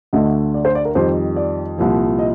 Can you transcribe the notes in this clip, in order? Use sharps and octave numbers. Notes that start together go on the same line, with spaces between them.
D2 D3 A3 D#5
D5
C5
D5
A#4
F2 D#3 G3 C5
D5
C2 A#2 F3
D#5